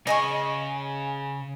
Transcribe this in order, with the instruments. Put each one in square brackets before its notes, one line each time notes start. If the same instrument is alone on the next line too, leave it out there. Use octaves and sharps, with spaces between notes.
[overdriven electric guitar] C#3 [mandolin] D#5 G#5 C#6